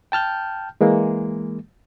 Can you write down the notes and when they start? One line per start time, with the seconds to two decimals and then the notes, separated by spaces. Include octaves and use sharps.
0.12 G5 A5 F6 G6
0.81 E3 G#3 A#3